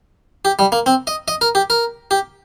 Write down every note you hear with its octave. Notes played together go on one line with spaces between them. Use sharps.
G4
G3
A#3
C4
D#5
D#5
A#4
G4
A#4
G4